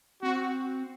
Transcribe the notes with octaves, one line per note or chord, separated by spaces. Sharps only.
C4 F#4